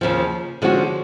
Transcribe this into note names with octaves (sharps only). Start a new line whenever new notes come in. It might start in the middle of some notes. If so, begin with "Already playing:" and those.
D#2 C#3 F3
D3 F3 G#3 C#4 F#4